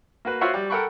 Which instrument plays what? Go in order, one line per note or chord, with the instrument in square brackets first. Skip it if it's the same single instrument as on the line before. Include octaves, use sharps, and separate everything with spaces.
[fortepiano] A#3 F#4 B4
F4 F#4 C5 C#5 E5 F#5
G3
A4 A#4 F#5 G5 B5 C#6